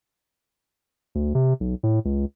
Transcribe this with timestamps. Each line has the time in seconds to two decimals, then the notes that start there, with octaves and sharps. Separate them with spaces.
1.15 D2
1.35 C3
1.60 B1
1.83 A2
2.05 C#2